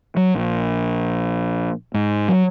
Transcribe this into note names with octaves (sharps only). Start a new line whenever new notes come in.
F#3
A#1
G#2
F#3